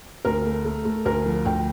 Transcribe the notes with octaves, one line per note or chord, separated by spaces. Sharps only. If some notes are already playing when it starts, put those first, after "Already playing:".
D2 A#4
A3
A3
A3
D2 A#4
F3
D2 G5